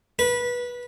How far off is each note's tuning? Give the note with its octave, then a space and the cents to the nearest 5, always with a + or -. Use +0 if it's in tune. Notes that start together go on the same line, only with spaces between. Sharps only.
B4 -20